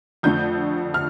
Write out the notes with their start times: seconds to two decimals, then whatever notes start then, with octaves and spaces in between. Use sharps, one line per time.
0.23 F2 D3 A3 G6
0.94 F6